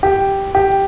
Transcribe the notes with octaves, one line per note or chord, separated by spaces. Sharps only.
G4
G4